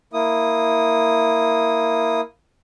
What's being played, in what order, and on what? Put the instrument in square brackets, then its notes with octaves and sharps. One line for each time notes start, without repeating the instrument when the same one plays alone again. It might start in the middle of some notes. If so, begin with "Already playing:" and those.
[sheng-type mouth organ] A#3 E4 D#6